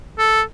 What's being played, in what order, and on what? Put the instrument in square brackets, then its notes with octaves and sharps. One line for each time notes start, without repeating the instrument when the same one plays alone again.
[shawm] A4